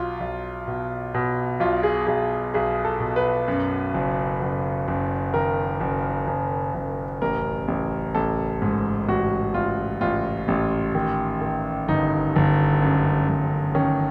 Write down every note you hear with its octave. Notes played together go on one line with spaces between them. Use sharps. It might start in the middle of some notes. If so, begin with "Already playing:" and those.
Already playing: B1 F4
B1
B2
B2
B1 F4
G#4
B1 G#4
B1 G#4
A4
B2
B4
F#2
F#1
F#1
F#1
D#3 A#4
F#1
F#1
F#1
A1 A#4
A1
A1 A4
G#2
A1 F#4
A1 F4
A1 F4
A1
D#3
D#3
G1 D#4
G1
F#2
G1
D#3 C#4